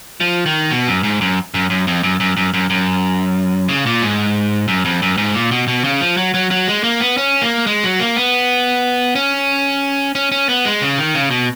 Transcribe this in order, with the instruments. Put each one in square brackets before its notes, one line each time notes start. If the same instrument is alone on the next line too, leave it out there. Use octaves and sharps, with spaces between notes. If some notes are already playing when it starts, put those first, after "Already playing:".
[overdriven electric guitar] F3
D#3
B2
F#2
G#2
F#2
F#2
F#2
F2
F#2
F#2
F#2
F#2
F#2
C#3
A#2
G#2
F#2
F2
F#2
G#2
A#2
B2
B2
C#3
F3
F#3
F#3
F#3
G#3
A#3
B3
C#4
A#3
G#3
F#3
A#3
B3
C#4
C#4
C#4
B3
G#3
C#3
D#3
C#3
B2